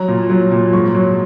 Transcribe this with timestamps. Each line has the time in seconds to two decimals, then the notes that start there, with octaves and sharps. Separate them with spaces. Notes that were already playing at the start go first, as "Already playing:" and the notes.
Already playing: F#3 A#5
0.08 A#2
0.30 F#3
0.52 A#2
0.73 G#2 C#6
0.95 F#3